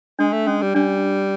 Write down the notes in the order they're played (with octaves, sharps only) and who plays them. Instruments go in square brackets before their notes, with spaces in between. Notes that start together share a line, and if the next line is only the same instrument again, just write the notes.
[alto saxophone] G#3 [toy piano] D4
[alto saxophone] A3
[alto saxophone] G#3 [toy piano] C#4
[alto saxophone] G3
[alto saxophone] G3 [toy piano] D4